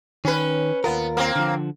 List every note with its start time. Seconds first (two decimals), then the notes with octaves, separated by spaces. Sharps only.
0.25 D#3 C#4 B4
0.84 D#2 B3 F4 A#4
1.17 A#3 C4
1.36 D3 F3